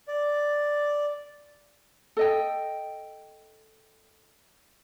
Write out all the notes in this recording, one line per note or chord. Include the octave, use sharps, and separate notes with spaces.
D5
A4 D#5 G5